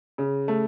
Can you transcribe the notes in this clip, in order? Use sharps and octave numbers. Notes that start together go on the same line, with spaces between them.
C#3
A3